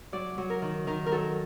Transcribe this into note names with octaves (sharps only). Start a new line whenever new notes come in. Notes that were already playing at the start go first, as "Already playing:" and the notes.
F#3 D5
F#3
A#4
D#3
D#3 A#4
A#4
F#3 A4